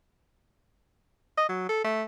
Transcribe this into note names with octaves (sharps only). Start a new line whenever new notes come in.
D#5
F#3
A4
A3